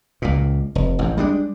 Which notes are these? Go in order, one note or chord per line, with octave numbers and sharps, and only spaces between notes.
C#2 A#2
F1
A1 F#2
G3 G#3 D4